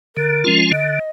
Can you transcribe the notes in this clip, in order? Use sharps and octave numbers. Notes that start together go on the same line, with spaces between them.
D3 A#4
F3 G#3 C#4 F4
D3 D#5